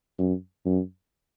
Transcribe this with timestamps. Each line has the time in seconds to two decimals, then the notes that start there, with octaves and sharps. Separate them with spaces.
0.18 F#2
0.65 F#2